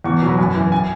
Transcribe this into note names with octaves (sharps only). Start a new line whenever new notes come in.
E2 C#6
B2 F#3
B5
F#2 G#5
E3
G#5